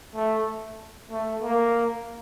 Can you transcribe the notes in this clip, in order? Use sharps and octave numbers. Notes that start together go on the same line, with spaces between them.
A3
A3
A#3